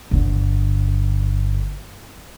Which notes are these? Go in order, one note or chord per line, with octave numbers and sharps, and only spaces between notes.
G1 D3